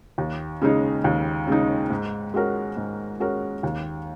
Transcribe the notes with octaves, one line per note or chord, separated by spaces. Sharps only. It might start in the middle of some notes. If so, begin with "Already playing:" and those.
D#2
C#3 G#3 D#4
D#2
C#3 G#3 D#4
G#2
G#3 C#4 F#4 A#4
G#2
G#3 C#4 F#4 A#4
D#2